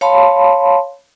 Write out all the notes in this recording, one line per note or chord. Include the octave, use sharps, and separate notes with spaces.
C#5 F5 A5 B5 C6